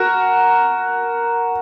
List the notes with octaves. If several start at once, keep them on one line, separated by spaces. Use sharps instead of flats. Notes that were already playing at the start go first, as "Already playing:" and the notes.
Already playing: F#4 A#4